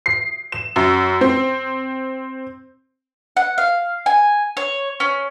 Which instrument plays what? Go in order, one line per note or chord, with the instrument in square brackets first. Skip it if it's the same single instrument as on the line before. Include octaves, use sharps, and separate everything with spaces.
[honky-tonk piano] C7
E7
F#2
C4
[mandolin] F#5
F5
G#5
C#5
C#4